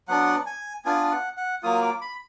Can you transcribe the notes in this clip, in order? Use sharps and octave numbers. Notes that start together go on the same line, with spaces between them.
F#3 B3 D4 F#5
G#5
B3 D4 F4 G#5
F#5
F#5
F#3 A#3 F4 D#6
D6
B5